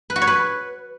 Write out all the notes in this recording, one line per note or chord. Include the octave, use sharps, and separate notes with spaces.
B4
F#4
C#5
B4